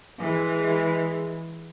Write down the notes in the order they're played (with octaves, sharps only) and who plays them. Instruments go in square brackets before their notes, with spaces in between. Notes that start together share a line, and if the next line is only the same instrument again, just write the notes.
[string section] E3 G#3